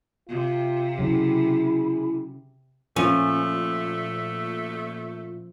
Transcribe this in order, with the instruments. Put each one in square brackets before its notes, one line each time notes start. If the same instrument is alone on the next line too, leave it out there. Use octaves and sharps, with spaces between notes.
[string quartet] C3 [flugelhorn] F4
[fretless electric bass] C#3 F#3 [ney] E4 [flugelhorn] G#4
[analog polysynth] A#2 [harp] F3 [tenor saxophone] A3 [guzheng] C#4